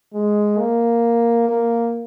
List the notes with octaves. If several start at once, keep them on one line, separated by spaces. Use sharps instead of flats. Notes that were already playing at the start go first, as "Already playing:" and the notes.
G#3
A#3
A#3